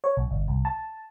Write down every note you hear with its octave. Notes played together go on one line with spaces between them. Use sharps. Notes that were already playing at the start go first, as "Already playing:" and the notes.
C#5
B1
G1
C2
A5